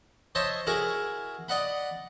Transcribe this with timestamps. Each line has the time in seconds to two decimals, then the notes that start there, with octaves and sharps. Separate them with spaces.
0.35 C5 C#5 D#5 E5 A5
0.67 E4 F#4 G#4 A#4
1.48 D5 D#5 F#5 B5